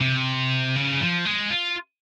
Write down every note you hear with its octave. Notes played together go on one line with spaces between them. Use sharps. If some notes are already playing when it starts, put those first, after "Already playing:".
C3
C#3
F3
G#3
F4